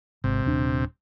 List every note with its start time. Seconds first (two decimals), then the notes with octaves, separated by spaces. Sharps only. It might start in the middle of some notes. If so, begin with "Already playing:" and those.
0.24 G#1 C3
0.46 D#1 D4